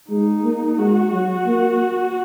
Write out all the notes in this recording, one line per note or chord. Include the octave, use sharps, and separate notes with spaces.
G#3 D#4
A#3
G#3 F#4
F#3
A#3